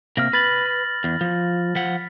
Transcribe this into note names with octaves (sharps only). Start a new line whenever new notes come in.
C3 A#3 F6 A#6
B4 B5 A6 F#7
E2
F3
F3 F#5 B6